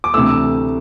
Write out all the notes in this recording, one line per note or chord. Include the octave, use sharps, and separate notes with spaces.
D6
D2 C3 E3 A3 E6